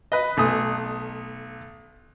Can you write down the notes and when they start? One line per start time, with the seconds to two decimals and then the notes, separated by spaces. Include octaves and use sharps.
0.12 B4 D#5
0.37 B1 A3 G#5 D#6